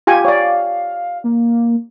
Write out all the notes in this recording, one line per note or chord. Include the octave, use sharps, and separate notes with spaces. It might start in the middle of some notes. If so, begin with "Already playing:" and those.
F4 G4 G#5
C#5 D5 F5
A#3